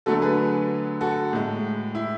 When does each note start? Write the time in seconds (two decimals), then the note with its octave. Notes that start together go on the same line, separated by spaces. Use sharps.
0.06 D3 F#3 A3 F#4 A4
0.22 G#4 B4
1.01 F#4 A4
1.33 A2 G#3
1.95 E4